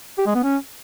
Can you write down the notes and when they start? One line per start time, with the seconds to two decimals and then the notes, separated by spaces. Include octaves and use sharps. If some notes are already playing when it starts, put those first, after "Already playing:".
0.18 G4
0.26 G#3
0.35 B3
0.43 C#4